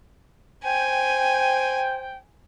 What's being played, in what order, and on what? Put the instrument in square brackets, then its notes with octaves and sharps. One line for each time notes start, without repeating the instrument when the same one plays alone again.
[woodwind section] C5 G5 [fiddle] G#5